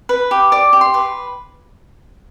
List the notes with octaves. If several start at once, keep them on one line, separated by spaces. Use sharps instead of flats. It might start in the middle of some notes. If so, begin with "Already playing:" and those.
B4
G4
D5 D6
G4
C6
B4